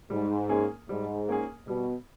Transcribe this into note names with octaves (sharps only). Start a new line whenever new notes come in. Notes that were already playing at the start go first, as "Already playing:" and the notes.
G#2 G3
A#3 C#4 G#4
G#2 G3
A#3 C#4 G#4
B2 G3